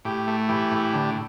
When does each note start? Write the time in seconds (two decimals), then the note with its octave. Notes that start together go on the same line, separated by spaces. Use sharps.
0.05 A2 G4
0.27 A3
0.49 E3 G4
0.71 A2
0.93 D3